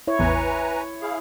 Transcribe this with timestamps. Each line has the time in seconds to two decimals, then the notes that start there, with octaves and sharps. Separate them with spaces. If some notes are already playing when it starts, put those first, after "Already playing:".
0.07 E4 C#5
0.19 A1 E2 B4 G#5 A#5
1.02 E4 G#4 F5